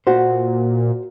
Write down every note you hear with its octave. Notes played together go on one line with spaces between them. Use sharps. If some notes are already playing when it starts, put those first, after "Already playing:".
A#2 F#4 C5